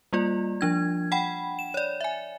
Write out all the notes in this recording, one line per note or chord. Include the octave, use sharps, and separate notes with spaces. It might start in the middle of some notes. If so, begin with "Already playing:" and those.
G3 A#3 F4 D5
F3 D4 G#6
F#5 G5 B5
E7
C#5 D5
E5 G#5